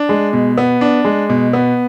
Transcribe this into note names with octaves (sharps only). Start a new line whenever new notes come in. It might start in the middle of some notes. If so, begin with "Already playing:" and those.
Already playing: D4
G#3
B2
B3
D4
G#3
B2
B3